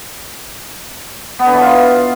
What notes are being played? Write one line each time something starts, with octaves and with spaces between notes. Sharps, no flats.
B3
D3
E3
F4